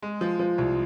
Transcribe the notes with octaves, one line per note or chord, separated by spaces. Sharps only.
G#3
F3
F3
C2